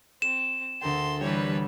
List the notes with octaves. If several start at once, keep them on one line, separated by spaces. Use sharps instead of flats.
C4 E7
D2 A4 A#4 G5 C6
D3 E3 G3 G4 B4 C#5